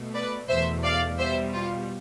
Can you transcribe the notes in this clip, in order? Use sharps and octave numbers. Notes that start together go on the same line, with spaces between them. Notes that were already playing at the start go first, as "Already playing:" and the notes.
Already playing: B2 A3
B4 D5
E2 B2 A3 C5 E5
D5 F5
B2 G3 C5 E5
F4